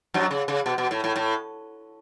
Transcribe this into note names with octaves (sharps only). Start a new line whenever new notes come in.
F#2 F#3
C#3
C#3
B2
B2
A2
A2
A2